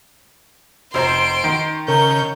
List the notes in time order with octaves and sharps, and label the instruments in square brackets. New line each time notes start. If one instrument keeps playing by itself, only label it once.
[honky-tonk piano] F1 C5 A#5 [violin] C6 D7
[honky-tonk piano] D#3
[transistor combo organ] C#3 [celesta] A#4 A#5 [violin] G6